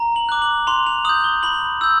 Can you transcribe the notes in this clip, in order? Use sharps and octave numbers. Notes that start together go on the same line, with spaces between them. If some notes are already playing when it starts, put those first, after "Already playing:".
Already playing: A#5
F#7
D6 F#6
F#7
C6 F7
F7
D#6 G6 F#7
G7
B5 F#7
E6 G6